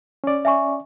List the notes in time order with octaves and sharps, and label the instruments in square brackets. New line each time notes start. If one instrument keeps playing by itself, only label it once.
[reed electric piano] C#4 D5
[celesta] E5 G#5 C#6